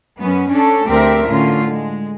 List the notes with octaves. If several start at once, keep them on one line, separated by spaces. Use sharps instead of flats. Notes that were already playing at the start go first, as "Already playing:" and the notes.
F#2 B3 C#4
C#4 D4 A4
D2 A3 C4 G4 A#4 E5
A2 D3 C#4 F4
G#3